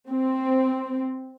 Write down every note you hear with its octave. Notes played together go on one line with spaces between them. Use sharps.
C4